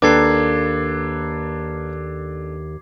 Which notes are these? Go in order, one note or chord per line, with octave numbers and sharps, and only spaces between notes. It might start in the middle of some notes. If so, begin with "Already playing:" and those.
D#2 A#3 D4 A4 B4 D6 G#6 C7